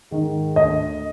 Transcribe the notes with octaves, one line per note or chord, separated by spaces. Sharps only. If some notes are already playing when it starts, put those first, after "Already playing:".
G#2 D#3
D2 D#5